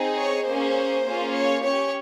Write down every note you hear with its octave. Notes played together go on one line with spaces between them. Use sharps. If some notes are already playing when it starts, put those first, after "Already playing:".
Already playing: C4 D#4 G#4
C#5
A#3 C#4 G#4 C5
A#3 C#4 F4 G#4
C#5
C#4 G4 C#5